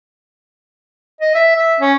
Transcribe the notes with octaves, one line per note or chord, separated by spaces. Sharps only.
D#5
E5
E5
C#4